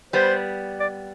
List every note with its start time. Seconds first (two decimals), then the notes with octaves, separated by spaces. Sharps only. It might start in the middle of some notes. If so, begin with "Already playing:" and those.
0.13 G3 B3 C5
0.80 D5